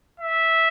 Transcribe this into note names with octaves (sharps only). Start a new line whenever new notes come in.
E5